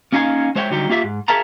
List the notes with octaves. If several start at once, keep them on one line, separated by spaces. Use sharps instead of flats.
A#3 C#4 D#4 F5 G#5
G#3 C5 C#5 E5 G5
D3 F#3 G3 D#4 G4
A#3 F4 G4 E5
G#2
G#4 A#4 E5 F5 A5 A#5